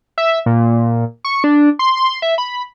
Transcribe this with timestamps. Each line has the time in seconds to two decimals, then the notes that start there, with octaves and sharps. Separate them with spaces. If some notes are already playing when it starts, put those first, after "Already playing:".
0.18 E5
0.46 A#2
1.25 C#6
1.44 D4
1.79 C6
1.97 C6
2.22 E5
2.38 B5